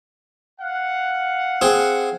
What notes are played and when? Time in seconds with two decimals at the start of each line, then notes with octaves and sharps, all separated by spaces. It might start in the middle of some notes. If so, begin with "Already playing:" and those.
0.61 F5 F#5
1.62 C4 G#4